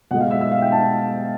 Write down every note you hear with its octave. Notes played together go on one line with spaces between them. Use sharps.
B2 G#3 F#5
F5
E5
E5
F5
G5
A5